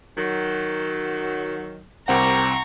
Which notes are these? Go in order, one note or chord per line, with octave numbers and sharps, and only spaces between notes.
D#3 F#3
C2 G3 C4 G4 A#4 F#5 A#5 C#6